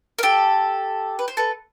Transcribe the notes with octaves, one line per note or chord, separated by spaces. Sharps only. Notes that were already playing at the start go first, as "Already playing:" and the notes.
A#4
G4 A4
B4
C5
A4 B4